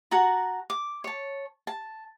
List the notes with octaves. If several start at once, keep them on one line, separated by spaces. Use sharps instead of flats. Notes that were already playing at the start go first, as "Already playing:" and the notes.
F#4 F#5 A5 A#5
D6
C#5 A5
A5